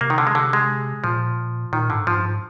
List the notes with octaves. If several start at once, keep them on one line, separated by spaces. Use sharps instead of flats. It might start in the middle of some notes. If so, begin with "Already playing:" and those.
C3 A#3
D#3
D3
G#3
D3
G#3
A#2 F3
A#2 D#3
G#2 D3
G#2 F3
G2
G#2